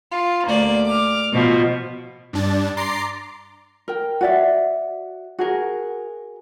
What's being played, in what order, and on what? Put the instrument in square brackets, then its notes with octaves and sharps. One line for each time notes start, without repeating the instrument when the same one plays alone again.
[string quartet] F4
D2 A#3 D5
D6 F6
B2 F3
[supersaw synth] G2 D4 A6
A#5 C6 D6 A6 C7
[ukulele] A#4 G5
F#4 D5 E5
F#4 G#4 A#4